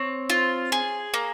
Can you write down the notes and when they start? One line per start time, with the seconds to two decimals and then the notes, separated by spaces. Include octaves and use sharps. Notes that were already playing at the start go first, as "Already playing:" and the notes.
Already playing: C4 C#5
0.30 F4
0.72 G#4
1.14 A#3